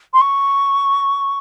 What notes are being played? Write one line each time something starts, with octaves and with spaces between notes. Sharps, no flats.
C6
C#6